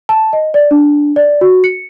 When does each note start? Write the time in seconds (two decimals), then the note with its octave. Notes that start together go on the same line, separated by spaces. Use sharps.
0.09 A5
0.33 D#5
0.54 D5
0.71 D4
1.16 D5
1.41 F#4
1.64 C#7